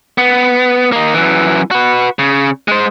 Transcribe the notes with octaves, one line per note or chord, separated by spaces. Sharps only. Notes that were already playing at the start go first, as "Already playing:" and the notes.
B3
A#3 D#4
F#2 E3
F#4 B4
C#3
G#3 C5